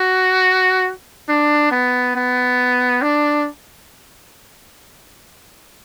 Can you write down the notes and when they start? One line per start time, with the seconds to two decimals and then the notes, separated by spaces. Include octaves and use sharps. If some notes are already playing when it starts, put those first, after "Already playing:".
Already playing: F#4
1.28 D4
1.71 B3
2.15 B3
3.02 D4